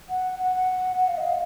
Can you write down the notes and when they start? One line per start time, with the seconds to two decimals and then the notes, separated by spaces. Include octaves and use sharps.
0.09 F#5
0.39 F#5
0.98 F#5
1.08 F5
1.17 D#5
1.27 F5